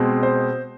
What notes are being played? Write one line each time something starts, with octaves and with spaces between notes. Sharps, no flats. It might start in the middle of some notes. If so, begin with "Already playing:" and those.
Already playing: B2 G#3 C4
C5